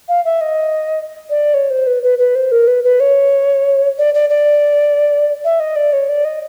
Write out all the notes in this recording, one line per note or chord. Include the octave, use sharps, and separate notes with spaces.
F5
E5
D#5
D5
C#5
C5
B4
B4
B4
C5
A#4
B4
B4
C#5
D5
D5
D5
E5
D#5
D5
C#5
D5
D#5